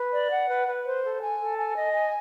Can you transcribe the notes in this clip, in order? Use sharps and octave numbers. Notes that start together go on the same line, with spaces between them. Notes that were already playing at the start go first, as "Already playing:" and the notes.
Already playing: B4
D5
F#5
B4
B4
C5
A4
G#5
A4
G#5
D#5
G#5